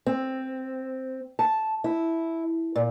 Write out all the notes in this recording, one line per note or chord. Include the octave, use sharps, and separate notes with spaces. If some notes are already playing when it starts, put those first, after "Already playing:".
C4
A5
E4
A#2